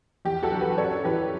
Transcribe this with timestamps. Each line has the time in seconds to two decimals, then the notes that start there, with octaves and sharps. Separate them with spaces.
0.25 E2 G4
0.43 F#4 A4
0.52 D3 F#3
0.60 G4 B4
0.78 F#2 A4 C#5
1.04 E3 G4 B4